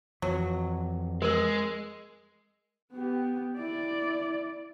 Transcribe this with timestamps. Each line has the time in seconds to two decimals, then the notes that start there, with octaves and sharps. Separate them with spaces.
0.22 F2 E3 F#3
1.22 G#3 A#4 E6
2.92 B3 G4
3.57 E4 D5